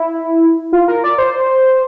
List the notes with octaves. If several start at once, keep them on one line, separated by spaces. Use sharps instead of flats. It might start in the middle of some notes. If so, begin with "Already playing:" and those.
Already playing: E4
F4
A#4
D5
C5